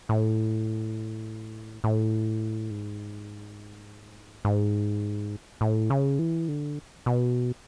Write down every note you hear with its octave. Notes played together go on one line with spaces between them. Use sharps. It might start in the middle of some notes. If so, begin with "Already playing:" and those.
A2
A2
G#2
G#2
A2
C#3
E3
D3
B2